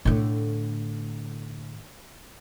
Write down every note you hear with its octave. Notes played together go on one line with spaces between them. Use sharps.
A2 D3